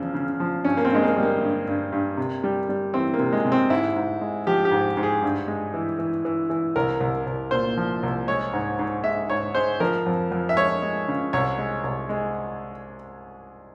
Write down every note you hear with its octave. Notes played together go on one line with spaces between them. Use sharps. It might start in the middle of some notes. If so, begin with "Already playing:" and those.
Already playing: E2 C#3 F3
C#3
F3
G2 C#4
A#3
C4
G2 G#3
A#3
G3
A#3
G2
G2
G2
C3
G3
G3
E3 C4
A#3
C3
G#3
C3
C4
G#2 E4
G#2
G#3
F3 G4
G4
G#2
G#2
G#4
G2
G#3
E3
E3
E3
E3
C2 A#4
C2
C2
A#2 C5
F3
C2
G#3 C#5
G#2
G#2
G#3 E5
G#2 C#5
G#3 C5
F3 A#4
F2
F2
E5
G#3 C#5
G#3
C#3
C2 C#5
G#3
C2
G#3